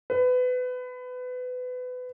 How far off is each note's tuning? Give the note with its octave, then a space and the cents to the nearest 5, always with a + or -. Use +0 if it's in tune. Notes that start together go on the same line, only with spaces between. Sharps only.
B4 +25